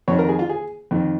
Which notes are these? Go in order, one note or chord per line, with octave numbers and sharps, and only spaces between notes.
F2 D#3 C#5
A#4
G#4
F4
G#4
F2 D#3